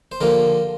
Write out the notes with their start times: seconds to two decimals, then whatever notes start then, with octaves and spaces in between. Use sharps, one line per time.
0.12 C5
0.21 D3 F3 A#3 G4 A#4